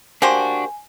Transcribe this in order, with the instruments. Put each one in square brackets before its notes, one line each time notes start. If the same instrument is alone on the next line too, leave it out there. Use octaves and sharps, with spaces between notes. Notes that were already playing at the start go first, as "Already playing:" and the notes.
[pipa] A#3 G4 C5 [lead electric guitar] D4 F#4 [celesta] G#5